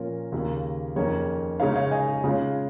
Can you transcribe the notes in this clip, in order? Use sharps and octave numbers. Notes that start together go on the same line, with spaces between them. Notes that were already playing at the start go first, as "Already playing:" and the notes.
Already playing: A#2 F3 C#4 F4 A#4
D#2 C#3 A#3
F2 D#3 A#3 C#4 G#4 C#5
C#3 G#3 D#4 C#5 F5
C#5 F5
D#5 G#5
G#4
C#3 G#3 C#4 F4